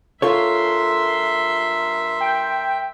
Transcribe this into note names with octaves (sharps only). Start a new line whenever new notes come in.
G2 F4 A4 A#4 C#5 E5 C6
G5